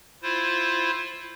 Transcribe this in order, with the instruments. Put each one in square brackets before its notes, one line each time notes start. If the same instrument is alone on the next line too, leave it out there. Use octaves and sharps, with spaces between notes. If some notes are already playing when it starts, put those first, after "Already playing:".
[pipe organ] E4 F4 C5